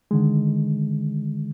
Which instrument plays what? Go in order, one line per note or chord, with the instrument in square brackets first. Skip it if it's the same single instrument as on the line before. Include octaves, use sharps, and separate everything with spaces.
[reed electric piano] D3 D#3 G#3